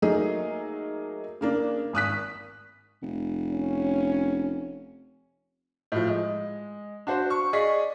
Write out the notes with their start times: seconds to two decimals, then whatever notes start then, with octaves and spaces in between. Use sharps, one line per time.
0.02 F#3 A3 A#3 D#4 G#4
1.41 C#3 A#3 D4
1.93 G#1 D#6 F#6 B6
3.02 F1
3.50 C#4
5.92 A2 F3
6.07 G#3
7.07 D4 F#4 C5
7.30 C#6
7.53 G#4 D5 D#5 C#6 B6